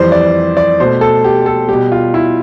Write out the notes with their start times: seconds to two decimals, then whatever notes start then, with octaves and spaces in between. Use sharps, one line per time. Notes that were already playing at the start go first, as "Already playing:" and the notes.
Already playing: F2 E3 G3 C5
0.12 D5
0.57 D5
0.80 B2 A3 C5
1.01 A4
1.24 G4
1.46 A4
1.68 B2 G3 G4
1.92 F4
2.14 E4